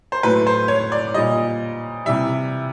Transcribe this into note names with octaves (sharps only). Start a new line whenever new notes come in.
C5
A2 F#3 A3 B4
C5
C#5
D5
A#2 G3 D#5
C3 E3 G3 E5